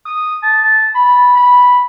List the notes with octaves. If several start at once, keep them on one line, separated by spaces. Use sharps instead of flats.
D#6
A5
B5
B5